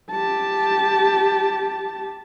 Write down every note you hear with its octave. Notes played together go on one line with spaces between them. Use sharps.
G4 A5